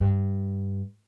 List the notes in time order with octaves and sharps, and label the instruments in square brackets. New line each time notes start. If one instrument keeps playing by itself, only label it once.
[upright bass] G2